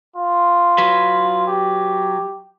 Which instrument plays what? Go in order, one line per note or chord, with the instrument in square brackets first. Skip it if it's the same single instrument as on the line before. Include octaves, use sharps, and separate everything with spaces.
[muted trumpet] F4
[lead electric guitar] F#3 B4
[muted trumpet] G4